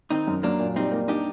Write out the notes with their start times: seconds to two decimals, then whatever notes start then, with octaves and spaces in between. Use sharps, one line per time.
0.10 D#3 C4 D#4
0.27 F#2
0.43 F#3 A#3 D4
0.59 A#2
0.76 G3 C4 D#4
0.92 A#3
1.08 D4 D#4 G4